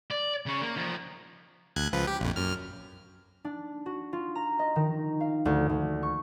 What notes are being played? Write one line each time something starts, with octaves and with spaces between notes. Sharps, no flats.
D5
C#3 C#5
A#3
F3 D#4
D2 F#6 G#6
C#2 F3 B4
G4
A#1 F2
F#2 F6
D4
F#4
F4
A#5
D#5
D#3
F5
D2
D2
C#6